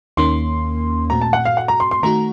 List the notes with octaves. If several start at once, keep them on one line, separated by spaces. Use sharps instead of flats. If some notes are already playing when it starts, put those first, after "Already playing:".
D#2 D#3 A#3 C#4 C6
A#2 A3 C4 F#4 A4 A#5
A5
F#5
F5
F#5
A#5
C6
C6
D#3 A3 D#4 F#4 A#5